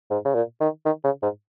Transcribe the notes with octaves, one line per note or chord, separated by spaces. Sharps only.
G#2
C#3
A#2
D#3
D#3
C#3
G#2